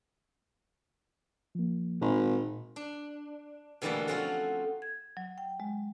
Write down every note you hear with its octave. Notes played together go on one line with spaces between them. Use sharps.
F3 A#3
G#1 A#2
D4
B2 D3 E3 G3 A3 A#3
F3 A3 C4 C#4 F4 F#4
G#6
F#3
G5
G#3